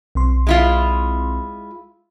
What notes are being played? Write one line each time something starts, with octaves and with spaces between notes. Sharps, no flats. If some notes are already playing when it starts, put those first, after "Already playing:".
B1 C4 C6
G#3 E4 F4